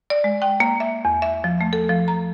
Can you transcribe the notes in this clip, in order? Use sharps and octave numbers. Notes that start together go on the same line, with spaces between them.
D5
G#3
G5
A#3
E5
E2
E5
F3
A3
A4
F3
A#5